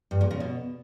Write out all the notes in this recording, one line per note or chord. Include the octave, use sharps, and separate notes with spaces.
G2
A#2
C#3
B2